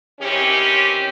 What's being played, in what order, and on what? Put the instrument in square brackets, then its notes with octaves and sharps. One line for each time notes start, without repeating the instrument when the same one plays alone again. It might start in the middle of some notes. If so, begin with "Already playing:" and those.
[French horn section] D#3 E3 C4 C#4 G4